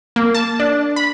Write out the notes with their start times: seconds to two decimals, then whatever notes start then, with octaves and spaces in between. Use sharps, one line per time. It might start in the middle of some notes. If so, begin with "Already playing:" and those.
0.16 A#3
0.35 A5
0.60 D4
0.96 B5